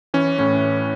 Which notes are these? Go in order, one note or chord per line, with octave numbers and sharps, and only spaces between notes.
E3 C#4
A2 C#4